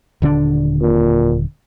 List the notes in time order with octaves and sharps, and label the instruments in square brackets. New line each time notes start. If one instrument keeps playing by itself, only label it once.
[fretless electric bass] D#1 D3 D4
[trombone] A#2